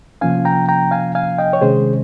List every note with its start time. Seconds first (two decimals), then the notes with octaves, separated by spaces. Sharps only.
0.21 C3 F3 A#3 C#4 F5 G#5
0.45 G5 A#5
0.68 G5 A#5
0.91 F5 G#5
1.15 F5 G#5
1.38 D#5 G5
1.53 C#5
1.61 C3 D#3 G#3 C#4 G#4 C5